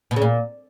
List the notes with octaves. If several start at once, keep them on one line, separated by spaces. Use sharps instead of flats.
B2
C#3
A#2